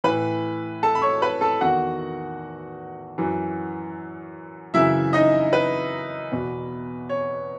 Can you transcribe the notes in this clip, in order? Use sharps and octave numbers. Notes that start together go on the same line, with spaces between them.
A2 E3 B4 B5
A4 A5
B5
C#5 C#6
B4 B5
A4 A5
E2 D#3 F#4 F#5
F#2 E3
F#2 C#3 E3 E4 E5
D#4 D#5
B4
E2 B2
C#5